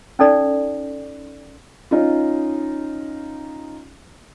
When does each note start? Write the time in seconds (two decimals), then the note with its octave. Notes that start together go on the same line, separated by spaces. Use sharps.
0.19 C#4 D#4 A4 D5
1.91 C#4 D#4 F4